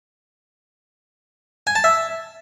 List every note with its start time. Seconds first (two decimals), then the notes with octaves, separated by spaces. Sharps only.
1.67 G#5
1.76 A5
1.84 E5